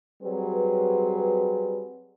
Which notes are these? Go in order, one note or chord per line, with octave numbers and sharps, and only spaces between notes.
F#3 G3 C4 G#4 B4